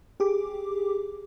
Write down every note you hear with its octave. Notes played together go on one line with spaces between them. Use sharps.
G4 G#4 D6